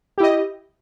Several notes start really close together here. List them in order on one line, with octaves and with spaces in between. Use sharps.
G4 E4 D#5